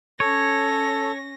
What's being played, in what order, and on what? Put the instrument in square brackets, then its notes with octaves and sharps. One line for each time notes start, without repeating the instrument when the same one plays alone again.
[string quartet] C#4 A#6 [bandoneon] A4 [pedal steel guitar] C#5